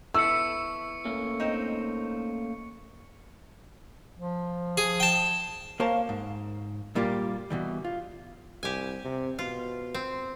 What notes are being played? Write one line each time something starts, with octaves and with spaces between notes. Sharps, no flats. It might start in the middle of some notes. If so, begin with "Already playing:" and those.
B3 E4 A4 C#6 E6 C#7
A3 A#3 C#4
C4 D#4
F3
G#4
G5 A5
A#3 A#4 C5 C#5 F5 A5
G#2
A#2 G3 A#3 F4 G4
B2 E3 G3
F4
C2 G4 G#5
C3
B2 F4
C4